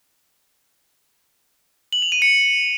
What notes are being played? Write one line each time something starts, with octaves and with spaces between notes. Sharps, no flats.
F#7
F7
D#7
C#7